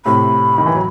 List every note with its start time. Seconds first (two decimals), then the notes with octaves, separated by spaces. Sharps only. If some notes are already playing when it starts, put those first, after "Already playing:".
0.05 A2 C3 B5
0.58 D#3
0.66 E3
0.74 F#3